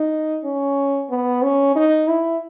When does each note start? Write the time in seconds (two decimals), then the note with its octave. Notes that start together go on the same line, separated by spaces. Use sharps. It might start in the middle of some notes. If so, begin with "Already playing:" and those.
Already playing: D#4
0.44 C#4
1.10 B3
1.43 C#4
1.76 D#4
2.08 E4